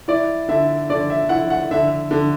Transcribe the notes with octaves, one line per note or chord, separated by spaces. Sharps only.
E4 D5
D3 E5
D3 D5
E5
E4 F#5
F#5
D3 E5
D3